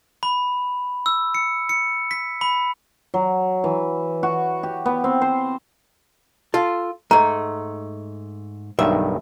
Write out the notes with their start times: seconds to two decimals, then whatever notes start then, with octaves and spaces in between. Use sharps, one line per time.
0.23 B5
1.06 E6
1.35 C#7
1.69 C#7
2.11 B6
2.41 B5
3.14 F#3
3.64 E3
4.23 F#4
4.63 G4
4.86 B3
5.04 C4
5.22 C5
6.54 F4 A4
7.11 G#2 A3 A#5
8.79 B1 G2 D#3 E5